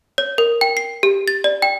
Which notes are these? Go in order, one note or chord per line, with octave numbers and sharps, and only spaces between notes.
C#5
A#4
G5
C7
G4
A6
D5
G5